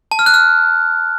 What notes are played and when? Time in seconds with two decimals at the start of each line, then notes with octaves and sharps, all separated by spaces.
0.11 A5
0.19 F6
0.26 F#6
0.34 F6